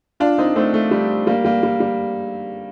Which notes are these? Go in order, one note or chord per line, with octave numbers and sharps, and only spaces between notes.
D4 F4
C4 D#4
A3 C4
A3
G3
G3 A#3
G3 A#3
G3
G3